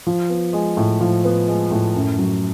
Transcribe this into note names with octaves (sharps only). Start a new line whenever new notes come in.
F3
B3
G#3
A2
F3
B3
G#3
A2
F#2
F#3